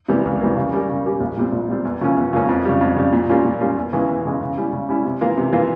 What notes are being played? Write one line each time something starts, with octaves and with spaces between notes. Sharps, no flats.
C3 E3 G3 A#3
C#2
C3 E3 G3 A#3
C#3
G3 C#4 G4 A#4
C#3
G3 C#4 G4 A#4
A#1
A#2 G3 C4
A#1
A#2 G3 C4
E2
C#3 F3 A#3 C#4
E2
C#3 F3 A#3 C#4
F2
C#3 G3
F2
C#3 G3
A#2
G3 A#3 C#4 F4
A#2
G3 A#3 C#4 F4
E2
C#3 E3 G#3
E2
C#3 E3 G#3
C#3
G3 C#4 E4
C#3
G3 C#4 E4
C3
E3 A#3 F4
C3
E3 A#3 F4